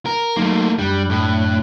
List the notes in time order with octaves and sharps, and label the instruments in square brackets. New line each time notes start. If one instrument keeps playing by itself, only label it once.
[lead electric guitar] A#4
[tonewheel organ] F#3 D#4 C6 [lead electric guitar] A3 A#3
[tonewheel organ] F#2 D4 F#6 [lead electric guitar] G3
[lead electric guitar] A2